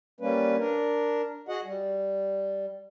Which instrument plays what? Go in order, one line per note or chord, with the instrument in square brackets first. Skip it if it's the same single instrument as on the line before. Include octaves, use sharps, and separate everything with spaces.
[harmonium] G3 A#3 C#4 B4
D4 A#4
F#4 G#4 D#5 F#5
G3